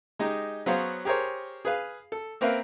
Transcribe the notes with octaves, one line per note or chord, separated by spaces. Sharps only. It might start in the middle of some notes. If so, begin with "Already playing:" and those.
G#3 D#4 G4
F#3 B3 G#4 C5 C#5 F5
G4 G#4 A#4 C5 C#5
G#4 B4 F5
A4
A#3 C4 A#4 B4 E5 F5